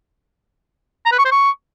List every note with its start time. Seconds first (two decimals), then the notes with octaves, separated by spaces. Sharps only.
1.06 A#5
1.12 B4
1.19 C#6
1.25 C5
1.31 C#6